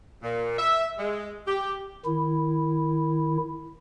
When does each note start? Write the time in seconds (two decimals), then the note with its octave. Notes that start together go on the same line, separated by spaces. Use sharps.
0.22 A#2
0.58 E5
0.98 G#3
1.46 G4
2.05 D#3 E4